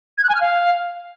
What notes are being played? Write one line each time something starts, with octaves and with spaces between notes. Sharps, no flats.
G#6
F#6
G#5
F6
F5